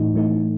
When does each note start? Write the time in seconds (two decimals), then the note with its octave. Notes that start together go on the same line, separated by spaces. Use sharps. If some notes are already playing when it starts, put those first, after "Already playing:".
Already playing: A2 E3 A3 D#4
0.14 A2 E3 A3 D#4